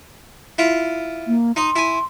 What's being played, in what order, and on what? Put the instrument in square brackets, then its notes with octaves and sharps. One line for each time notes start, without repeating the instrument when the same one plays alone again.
[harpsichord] E4 F4
[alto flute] A#3
[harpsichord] D#4 D#5 [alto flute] C6
[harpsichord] E4 G#5